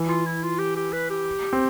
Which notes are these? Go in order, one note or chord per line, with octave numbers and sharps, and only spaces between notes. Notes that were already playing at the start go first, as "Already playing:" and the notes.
Already playing: E3
F4
E4
F4
G4
G4
B4
G4
C4